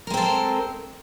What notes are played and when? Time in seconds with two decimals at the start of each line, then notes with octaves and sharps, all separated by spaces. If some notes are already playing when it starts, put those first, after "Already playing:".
0.07 A#4
0.10 G#3
0.14 C4
0.17 A4